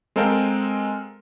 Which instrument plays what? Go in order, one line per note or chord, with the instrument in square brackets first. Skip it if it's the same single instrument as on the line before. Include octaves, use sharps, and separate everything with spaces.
[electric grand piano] G#3 C4 A4 A#4 F5 G5